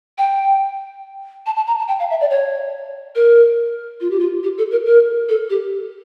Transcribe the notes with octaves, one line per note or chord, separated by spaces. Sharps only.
G5
A5
A5
A#5
A5
G5
F5
E5
D5
C#5
A#4
F4
G4
F4
G4
A4
A#4
A#4
A4
G4